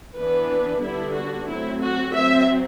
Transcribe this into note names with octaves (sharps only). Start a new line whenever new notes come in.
E3 B3 D4 B4
D3 G3 B3 D4 E4
F#4
F#3 A3 C4 E4
F#4
F#3 C4 E5